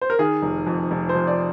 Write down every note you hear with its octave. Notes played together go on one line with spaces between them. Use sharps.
C5
A#4
D#3 G#4
F1
F2
F1
C5
F2
D5